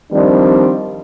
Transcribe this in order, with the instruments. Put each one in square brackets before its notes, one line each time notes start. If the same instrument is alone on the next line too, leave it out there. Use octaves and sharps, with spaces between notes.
[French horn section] D#3 F3 G3 C4 D4